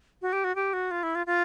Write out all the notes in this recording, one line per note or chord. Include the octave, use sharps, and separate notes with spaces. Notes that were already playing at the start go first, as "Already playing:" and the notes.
F#4
G4
F#4
G4
F#4
F4
E4
F4
F4